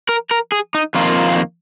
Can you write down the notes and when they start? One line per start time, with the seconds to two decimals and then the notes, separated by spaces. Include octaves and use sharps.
0.09 A#4
0.31 A#4
0.52 G#4
0.74 D#4
0.95 F2 D#3 A#3 F4